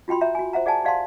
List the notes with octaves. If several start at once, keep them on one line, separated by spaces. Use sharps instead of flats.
F4 F#4 G5 B5 C6
C#5 E5 A#5
F#4 G#5
C5 E5 F#5 A#5
G#4 D5 F#5 G#5 A5
G4 D5 F5 F#5 A5 C6